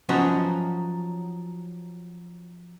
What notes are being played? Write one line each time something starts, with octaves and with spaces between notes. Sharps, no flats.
F3 F#3 C#4 D#4 F#4 B4